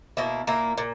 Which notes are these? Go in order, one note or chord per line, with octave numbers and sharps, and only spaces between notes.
B2 A#3 E4
A#2 A#3 E4
A#2